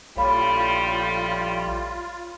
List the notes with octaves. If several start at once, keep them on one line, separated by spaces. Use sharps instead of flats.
A#1 A2 G3 F4 C#5 F5 B5